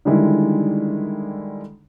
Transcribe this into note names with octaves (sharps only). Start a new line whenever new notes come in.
D3 D#3 G3 G#3 E4